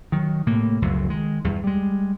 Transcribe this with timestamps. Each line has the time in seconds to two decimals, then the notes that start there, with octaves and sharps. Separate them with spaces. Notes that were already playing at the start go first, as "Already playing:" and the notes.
0.12 D#3 F#3
0.47 A2 C3 A#3
0.82 F1 C#2 F#2 F#3
1.09 D#3 G#3
1.44 E2 G2
1.64 G3 G#3